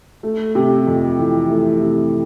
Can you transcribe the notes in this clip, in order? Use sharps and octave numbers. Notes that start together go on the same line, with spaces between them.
A3
C3
F2
E3
A3
C3